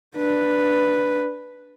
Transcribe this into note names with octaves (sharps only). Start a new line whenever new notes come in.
D4 B4